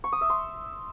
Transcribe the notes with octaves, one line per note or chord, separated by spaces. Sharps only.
C#6
D#6
E5
C6